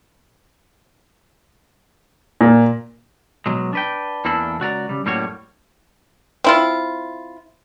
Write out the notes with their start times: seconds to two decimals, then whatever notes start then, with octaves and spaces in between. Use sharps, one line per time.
2.41 A#2
3.46 B2 F#3 G#3
3.73 D4 B4 G5
4.25 E2 E3 A#3 D4 A4 B5
4.60 C#2 F#4 D5 A#5
4.89 C#3 G3
5.05 F#2 A2 G3 A#3 F#4 C#5
6.44 C4 E4 F4